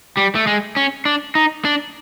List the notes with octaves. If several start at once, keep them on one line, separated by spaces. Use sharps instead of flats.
G3
A3
G#3
C#4
D4
D#4
D4